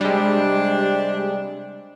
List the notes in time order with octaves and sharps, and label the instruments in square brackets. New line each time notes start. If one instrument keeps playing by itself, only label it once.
[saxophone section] C3 D4 [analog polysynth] G3 G#3